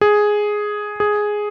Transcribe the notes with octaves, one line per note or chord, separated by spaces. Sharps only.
G#4
G#4